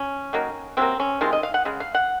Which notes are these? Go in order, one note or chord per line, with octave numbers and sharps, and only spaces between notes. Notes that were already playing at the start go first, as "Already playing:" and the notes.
Already playing: C#4
D#3 F#3 A#3
C3 F#3 A#3 C4
C#4
C3 D#3 G#3 F4
D#5
F5
F#5
C#3 G#3
F5
F#5